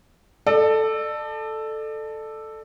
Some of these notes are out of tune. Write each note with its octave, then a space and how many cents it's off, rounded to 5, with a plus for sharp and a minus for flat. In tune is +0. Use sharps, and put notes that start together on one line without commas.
A4 +0 D5 +40